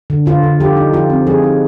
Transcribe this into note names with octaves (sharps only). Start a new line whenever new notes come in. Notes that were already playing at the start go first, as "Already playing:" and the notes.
D3
D3 F4
D3
F3 G4
D#4
F3 F4
C4
F3 G#4
D#4